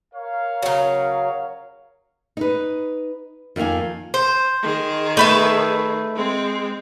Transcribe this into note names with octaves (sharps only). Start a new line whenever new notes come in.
A#4 C#5 F5
C#3 F#3
D#4 B4
F2 D#3 A#3 F5 G#5
C5
D#3 G#4
A3 B4 E5
G#3 C4